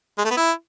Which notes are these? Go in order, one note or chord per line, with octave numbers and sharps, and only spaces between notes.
G#3
A3
B3
E4